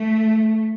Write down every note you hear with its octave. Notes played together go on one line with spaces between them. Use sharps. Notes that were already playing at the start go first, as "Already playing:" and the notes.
Already playing: A3